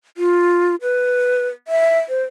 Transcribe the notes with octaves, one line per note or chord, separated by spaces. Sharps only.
F4
B4
E5
C5